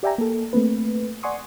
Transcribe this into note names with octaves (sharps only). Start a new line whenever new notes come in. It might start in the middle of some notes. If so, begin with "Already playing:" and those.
G4 D5 E5 G5 G#5 A#5
A#3 A4
A3 A#3 C4 B4
D5 F#5 G#5 C6 C#6 D#6